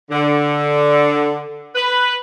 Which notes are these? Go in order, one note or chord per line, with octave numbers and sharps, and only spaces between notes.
D3
B4